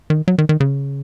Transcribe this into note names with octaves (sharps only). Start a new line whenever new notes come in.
D#3
F#3
D#3
D#3
C#3